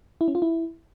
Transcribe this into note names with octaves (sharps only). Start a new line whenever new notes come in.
E4
C#4
F4
E4